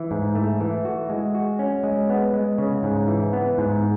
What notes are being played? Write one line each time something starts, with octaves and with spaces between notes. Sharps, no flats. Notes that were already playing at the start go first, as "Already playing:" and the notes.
Already playing: E3
G#2
A3
E3
F#4
G#3
F#4
C#4
G#3
B3
G#3
C#3
G#2
E3
B3
G#2